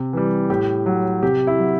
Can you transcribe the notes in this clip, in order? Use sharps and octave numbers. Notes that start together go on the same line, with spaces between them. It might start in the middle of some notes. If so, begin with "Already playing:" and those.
Already playing: C3
E3 G3
A2 G4
F#3
C3 G4
E4
F#3